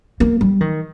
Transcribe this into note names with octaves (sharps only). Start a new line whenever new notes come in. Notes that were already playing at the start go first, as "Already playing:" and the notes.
A#3
G3
D#3